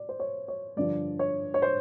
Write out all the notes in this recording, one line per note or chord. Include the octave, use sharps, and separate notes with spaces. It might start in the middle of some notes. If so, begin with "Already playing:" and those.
Already playing: D5
C5
C#5
C#5
G2 D3 F3 D5
C#5
C#5
C5